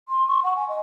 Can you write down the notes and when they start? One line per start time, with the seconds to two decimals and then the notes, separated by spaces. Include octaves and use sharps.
0.08 C6
0.27 C#6
0.43 F#5
0.56 G#5
0.68 D#5